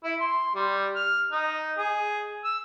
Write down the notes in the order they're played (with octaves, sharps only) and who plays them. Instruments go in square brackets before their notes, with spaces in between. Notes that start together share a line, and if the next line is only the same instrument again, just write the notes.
[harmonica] E4
C6
G3
F6
D#4
G#4
E6